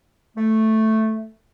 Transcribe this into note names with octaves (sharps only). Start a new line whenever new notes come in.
A3